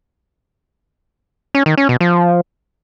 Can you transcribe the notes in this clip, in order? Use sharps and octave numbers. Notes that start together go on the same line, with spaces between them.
C#4
D#3
C#4
B2
F3